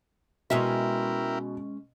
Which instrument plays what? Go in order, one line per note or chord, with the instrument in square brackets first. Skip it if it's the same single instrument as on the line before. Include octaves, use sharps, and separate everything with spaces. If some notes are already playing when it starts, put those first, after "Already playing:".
[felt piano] B2 [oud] G#3 C#4 E5 [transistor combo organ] E4 A#4 G5